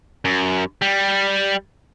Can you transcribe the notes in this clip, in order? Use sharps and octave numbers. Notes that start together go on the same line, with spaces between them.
F#2
G3